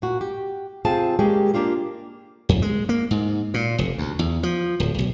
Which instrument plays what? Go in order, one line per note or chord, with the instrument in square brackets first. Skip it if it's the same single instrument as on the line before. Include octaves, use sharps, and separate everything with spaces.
[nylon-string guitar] A#2 F#4
G4
C3 C4 F4 G#4 A5
G#3 A#3 C#4 G4 G#4
A#3 D4 F4 G4
[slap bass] F2
G#3
A#3
G#2
A#2
F1
D2
E2
F3
D1
B1